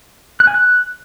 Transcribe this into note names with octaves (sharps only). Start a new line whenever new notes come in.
F#6
G#5
F#6